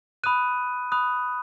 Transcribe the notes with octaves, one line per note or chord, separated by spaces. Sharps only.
B5 D#6 F#6 D#7
B5 D#6 F#6